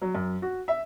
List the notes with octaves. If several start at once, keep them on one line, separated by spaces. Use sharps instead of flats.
F#3
F#2
F#4
E5